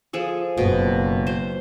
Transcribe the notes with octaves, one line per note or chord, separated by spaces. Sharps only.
F3 G#4 A4
F#1 B2
C5